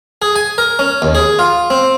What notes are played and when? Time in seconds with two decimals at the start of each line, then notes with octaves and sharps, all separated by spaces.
0.22 G#4
0.36 G#5
0.58 A#4
0.79 C#4
1.02 D#2
1.15 G#4
1.39 F4
1.70 C4